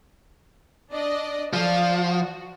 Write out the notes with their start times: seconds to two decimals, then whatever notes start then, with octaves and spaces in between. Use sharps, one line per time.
0.92 D4 D5 D#5
1.53 F3 A4 D5 F5
1.95 F#4